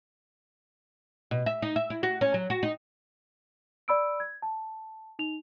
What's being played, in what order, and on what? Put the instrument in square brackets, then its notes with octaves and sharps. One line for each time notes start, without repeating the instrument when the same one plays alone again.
[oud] B2
E5
D#4
E5
E4
F#4
C#4
F#3
F#4
D#4
[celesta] D5 B5 E6 D7
G#6
A5
D#4 F7